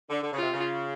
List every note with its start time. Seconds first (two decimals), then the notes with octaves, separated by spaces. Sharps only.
0.08 D3
0.22 D3
0.32 C#3 F4
0.42 C3
0.53 C#3